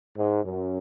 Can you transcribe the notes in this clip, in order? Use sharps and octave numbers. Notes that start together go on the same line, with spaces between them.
G#2
F#2